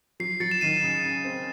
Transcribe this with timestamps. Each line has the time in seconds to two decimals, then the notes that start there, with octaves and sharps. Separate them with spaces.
0.20 F#3 C7
0.40 F#3 A6 C#7
0.51 E7
0.61 D#3 C7 D#7
0.83 C#3
1.04 C#3
1.25 C4